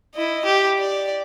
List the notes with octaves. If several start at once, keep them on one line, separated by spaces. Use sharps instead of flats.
E4 D#5
G4
D5